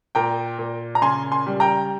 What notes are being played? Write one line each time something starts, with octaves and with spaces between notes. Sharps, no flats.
A#2 G5 A#5
A#2
A#5
C#3 G#5 C6
G#5 C6
G3
G5 A#5